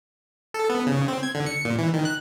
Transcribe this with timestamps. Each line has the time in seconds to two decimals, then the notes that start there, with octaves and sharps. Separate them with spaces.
0.54 A4
0.70 B3
0.87 C#3
1.08 C4
1.23 G#6
1.35 D3
1.46 C#7
1.65 A#2
1.78 E3
1.94 D#3
2.05 F#6